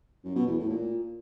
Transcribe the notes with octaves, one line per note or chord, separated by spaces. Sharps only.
F#2
B2
E2
A2
A#2